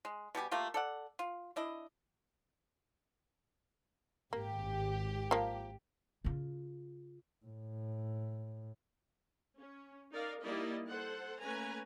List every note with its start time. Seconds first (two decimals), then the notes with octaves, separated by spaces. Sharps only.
0.05 G#3
0.35 B2 G3 G4 G#5
0.51 A3 A#3 F4 G4
0.74 A4 D5 F#5
1.19 F4
1.56 D4 E4 D#5
4.33 G#1 A#3 G4
5.31 F3 A#3
6.24 C#3 F4
7.46 A2
9.58 C#4
10.12 D#4 A#4 D5 F5
10.44 G3 A#3 D#4 E4 D5 D#5
10.88 A4 C5 F#5
11.40 A3 A#3 C#4 B4 G#5 A#5